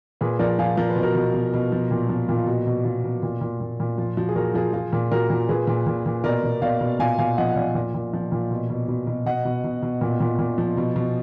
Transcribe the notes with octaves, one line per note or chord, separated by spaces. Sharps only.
A#2 G#4 B4
F3 A#4 D5
F3 F5 G#5
F3 A#4
B4
B2
F#4 A#4
B2
B2
B2
F3
A#2
F3
A#2
F4
B2 F#4
B2
B2 F4
B2
A#2
A#2
A#2
A#2
F3 F4
F3 F#4
G#4
A#2 F#4 A#4
F3 F4 G#4
F3 F4 G#4
A#2
A#2 F#4 A#4
A#2
A#2 G#4 B4
A#2
A#2
A#2
B2 A#4 D5
B2
B2 D5 F5
B2
A#2 F5 G#5
A#2 F5 G#5
F3 D#5 F#5
F#5
A#2 D5 F5
A#2
A#2
F3
A#2
B2
B2
B2
B2
B2 D#5 F#5
B2
B2
B2
A#2
A#2
A#2
F3
B2
B2